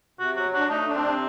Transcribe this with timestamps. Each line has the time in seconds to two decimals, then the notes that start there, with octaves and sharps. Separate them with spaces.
0.19 C3 F#4
0.36 F#3 F#4
0.53 D4 F#4
0.70 A3 D#4
0.88 D4
0.95 C4
1.04 C3